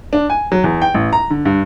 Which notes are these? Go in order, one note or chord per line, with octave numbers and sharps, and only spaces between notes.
D4
G#5
F#3
E2
G5
A1
A#5
D3
G2